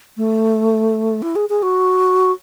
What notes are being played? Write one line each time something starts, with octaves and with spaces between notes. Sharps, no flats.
A3
E4
G#4
G#4
F#4